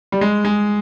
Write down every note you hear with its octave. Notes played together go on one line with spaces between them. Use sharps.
G3
G#3
G#3